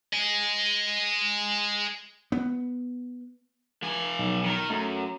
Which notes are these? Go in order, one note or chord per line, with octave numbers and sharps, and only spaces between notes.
D#5 G#5
B3
F3 G#5
B1
D#3 A#4
F#2 A3